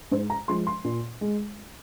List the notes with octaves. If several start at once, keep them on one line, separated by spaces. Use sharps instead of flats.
G#2 C5
A#5
F3 G#3 C6
C6
A#2
G#3